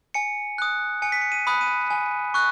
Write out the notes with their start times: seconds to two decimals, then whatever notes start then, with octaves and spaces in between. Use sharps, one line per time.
0.14 G#5 C#7
0.58 D#6 F#6
1.02 G#5 C#7
1.12 B6
1.22 C#7
1.32 D#7
1.47 B5 D#6 F#6
1.61 D#7
1.91 G#5
2.34 C#6 F#6